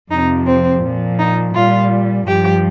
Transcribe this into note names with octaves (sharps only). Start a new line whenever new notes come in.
F2 C3 F3 D#4
C4
A#2 F3
D#4
A#2 G3 F4
G2 F3 G4